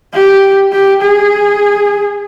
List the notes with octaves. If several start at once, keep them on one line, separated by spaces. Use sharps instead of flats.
G4
G4
G#4